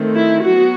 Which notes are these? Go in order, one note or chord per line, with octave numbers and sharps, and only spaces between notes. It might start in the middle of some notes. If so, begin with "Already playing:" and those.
Already playing: D#3 A3 C4
E4
F#3 B3 F#4